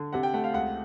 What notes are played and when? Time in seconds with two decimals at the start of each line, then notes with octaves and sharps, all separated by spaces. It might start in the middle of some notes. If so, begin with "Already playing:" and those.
Already playing: D3
0.13 C3 F#5
0.23 G5
0.34 A3 F#5
0.44 F5
0.53 C#2 F#5